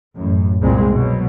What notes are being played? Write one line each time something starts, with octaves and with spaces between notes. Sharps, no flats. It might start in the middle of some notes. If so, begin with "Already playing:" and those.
A1 F#2
C2 A#2 G#3 C4
B2 F#3